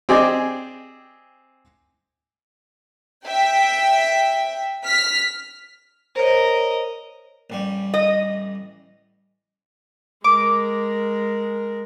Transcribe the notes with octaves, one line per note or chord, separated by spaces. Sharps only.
C4 G4 G#4 D5 D#5 G#5
E5 G5
F6 B6
A#4 C5 C#5 D#5
A1 G3
D#5
G#3 A#4 D6